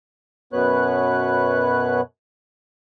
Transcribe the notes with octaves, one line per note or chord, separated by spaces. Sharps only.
F#2 B2 B3 B4 C#5 F#6